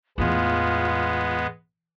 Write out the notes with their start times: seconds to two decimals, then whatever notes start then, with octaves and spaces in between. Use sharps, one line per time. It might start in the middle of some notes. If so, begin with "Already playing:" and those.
0.18 E2 A2 G#3 B3 F4